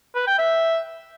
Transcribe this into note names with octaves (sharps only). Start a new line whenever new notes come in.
B4
G5
E5